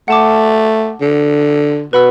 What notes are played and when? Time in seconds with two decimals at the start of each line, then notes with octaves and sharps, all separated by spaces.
0.08 A3 F#5 A5 D6
1.01 D3
1.93 B2 B4 F#5 B5 E6